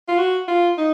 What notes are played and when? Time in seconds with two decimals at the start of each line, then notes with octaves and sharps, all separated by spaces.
0.08 F4
0.18 F#4
0.48 F4
0.78 D#4